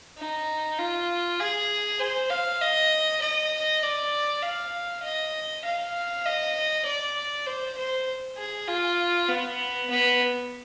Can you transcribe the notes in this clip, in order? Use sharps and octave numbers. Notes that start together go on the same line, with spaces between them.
D#4
F4
G#4
C5
F5
D#5
D#5
D5
F5
D#5
F5
D#5
D5
C5
C5
G#4
F4
B3
B3